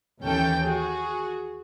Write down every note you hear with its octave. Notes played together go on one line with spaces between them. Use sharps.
D#2 E3 C#4 A4 G5
F#4 G#4